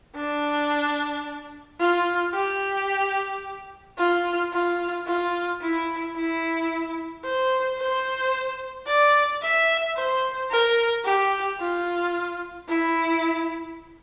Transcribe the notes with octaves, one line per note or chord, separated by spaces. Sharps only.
D4
F4
G4
F4
F4
F4
E4
E4
C5
C5
D5
E5
C5
A#4
G4
F4
E4